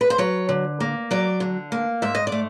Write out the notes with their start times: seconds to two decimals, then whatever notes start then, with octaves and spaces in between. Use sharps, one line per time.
0.01 B4
0.10 C5
0.18 F#3 C#5
0.49 D3
0.80 A#3
1.11 F#3 D5
1.40 D3
1.72 A#3
2.02 G#2 E5
2.15 D#5
2.27 D5
2.32 A3